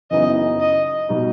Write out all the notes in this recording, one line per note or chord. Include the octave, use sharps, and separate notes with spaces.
F#1 F#2 E3 B3 D#4 D#5
D#5
B2 G3 D#4